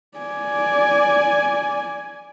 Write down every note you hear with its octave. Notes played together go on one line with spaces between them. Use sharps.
D5 G#5